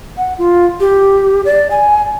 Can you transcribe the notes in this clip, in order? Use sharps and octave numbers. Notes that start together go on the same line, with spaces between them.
F#5
F4
G4
D5
G#5